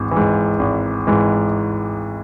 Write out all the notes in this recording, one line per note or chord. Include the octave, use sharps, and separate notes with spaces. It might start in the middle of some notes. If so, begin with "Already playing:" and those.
Already playing: G#1 G#2 E3
E3
G#2
G#1
G#2 E3